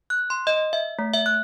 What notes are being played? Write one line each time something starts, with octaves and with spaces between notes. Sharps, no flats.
F#6
C6
D#5
E5
A3
E5
F#6